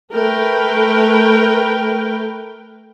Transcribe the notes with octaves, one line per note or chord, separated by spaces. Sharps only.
A3 A#4 B4 G5